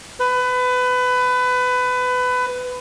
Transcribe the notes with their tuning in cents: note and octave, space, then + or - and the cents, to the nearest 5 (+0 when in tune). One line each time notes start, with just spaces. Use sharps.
B4 +25